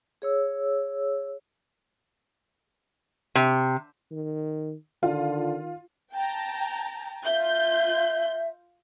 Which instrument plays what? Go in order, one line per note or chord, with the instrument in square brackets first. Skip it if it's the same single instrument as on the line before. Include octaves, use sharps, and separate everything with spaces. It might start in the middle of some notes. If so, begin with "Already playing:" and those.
[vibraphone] G#4 C#5 E6
[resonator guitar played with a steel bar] C3
[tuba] D#3
[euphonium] D3 [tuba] D#3 [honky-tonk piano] F4
[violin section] G5 A5 A#5
[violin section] F4 G6 [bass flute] E5